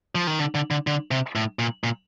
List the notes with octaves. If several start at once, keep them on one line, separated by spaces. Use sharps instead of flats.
F3
D#3
D3
D3
D3
D3
C3
A2
A#2
A#2